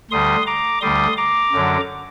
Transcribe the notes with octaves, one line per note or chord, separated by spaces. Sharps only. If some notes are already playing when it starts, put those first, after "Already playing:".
D2 D3 G3 C6 D#6
A#5 D6
D2 D3 G3 C6 D#6
A#5 D6
F#2 D3 F#3